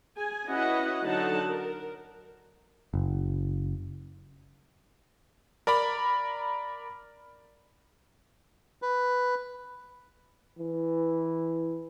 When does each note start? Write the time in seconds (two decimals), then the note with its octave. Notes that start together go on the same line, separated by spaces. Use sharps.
0.16 G#4 G#5
0.47 C#4 E4 F#4 B4 D#5 F#5
1.04 D3 F#3 D#4 A4 F#5 A5
1.47 A#4
2.94 F#1
5.67 A#4 D5 A#5 B5
8.82 B4
10.59 E3